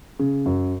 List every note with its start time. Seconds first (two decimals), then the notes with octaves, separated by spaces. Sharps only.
0.19 C#3
0.46 F#2